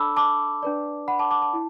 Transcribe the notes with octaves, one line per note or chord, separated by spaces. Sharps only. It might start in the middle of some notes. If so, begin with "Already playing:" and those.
Already playing: D4 A4 D5 A5 B5 D6 E6
A5 D6
D4 B4 D5
F#5 B5
A5 D6
A5 D6
A5
E4